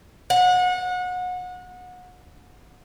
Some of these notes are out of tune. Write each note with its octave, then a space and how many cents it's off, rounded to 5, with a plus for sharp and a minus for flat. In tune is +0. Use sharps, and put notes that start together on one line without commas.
F#5 -30